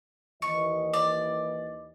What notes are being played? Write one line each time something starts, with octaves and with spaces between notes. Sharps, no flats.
D#2 E3 D#5 C#6
D5